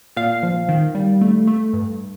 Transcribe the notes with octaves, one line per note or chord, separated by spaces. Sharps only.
A#2 F5
F3
D#3
G3
A3
A3
G2